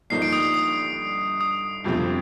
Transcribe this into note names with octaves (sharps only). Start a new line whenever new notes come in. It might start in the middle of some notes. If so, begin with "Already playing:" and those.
G1 G2 F3 A#3 D#4 C7
D7
D#6
D#6
D#6
D#6
G1 F2 C3 F3 C4